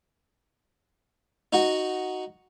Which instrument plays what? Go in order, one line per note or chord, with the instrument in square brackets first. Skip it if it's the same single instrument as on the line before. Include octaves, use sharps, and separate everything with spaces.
[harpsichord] D#4 F#4 F#5